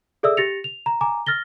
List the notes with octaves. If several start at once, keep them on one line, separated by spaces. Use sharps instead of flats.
G#4 A4 D5 E5 D#6 E6
G4 A6 A#6 C#7 F7
F7
A#5
G#5 A#5 D6
F6 A6 A#6 G7